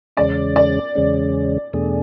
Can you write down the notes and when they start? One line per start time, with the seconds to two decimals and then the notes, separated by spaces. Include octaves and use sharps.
0.17 E2 C#3 G#3 C#4 D5
0.56 D5
0.95 E2 C#3 G#3 C#4
1.73 E2 B2 A3 D4 G#4